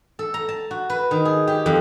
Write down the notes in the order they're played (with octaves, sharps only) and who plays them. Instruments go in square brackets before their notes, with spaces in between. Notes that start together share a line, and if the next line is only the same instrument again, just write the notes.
[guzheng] A4
A#5
A5
F#4
B4
D#3
G#4
G4
F2